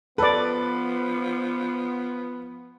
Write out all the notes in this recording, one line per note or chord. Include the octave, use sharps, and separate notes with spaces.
F3 B3 A4 B4 D5